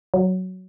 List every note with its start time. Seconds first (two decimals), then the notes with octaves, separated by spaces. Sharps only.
0.14 F#3